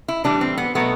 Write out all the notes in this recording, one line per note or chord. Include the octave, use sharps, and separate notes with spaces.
E4
A2 E3 G3 D4
C4
B3
B2 F#3 A3 B3